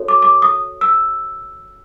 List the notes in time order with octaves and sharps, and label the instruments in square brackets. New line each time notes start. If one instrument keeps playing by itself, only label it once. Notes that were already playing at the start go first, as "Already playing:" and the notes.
Already playing: [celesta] F#4 A4 C#5
D6
D6
D#6
E6